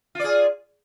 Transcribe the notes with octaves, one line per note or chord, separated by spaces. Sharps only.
F4 G#4 D5